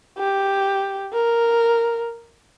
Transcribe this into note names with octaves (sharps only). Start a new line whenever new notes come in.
G4
A#4